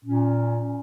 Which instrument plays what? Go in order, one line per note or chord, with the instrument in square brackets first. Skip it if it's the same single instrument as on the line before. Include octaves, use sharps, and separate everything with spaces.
[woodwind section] A#2 C#4